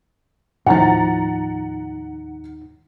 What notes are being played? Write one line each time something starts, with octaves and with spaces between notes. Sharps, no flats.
D#2 A2 F3 D#4 F#5 A#5 A6